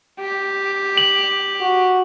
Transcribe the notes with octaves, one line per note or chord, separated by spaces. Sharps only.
G4
F#7
F#4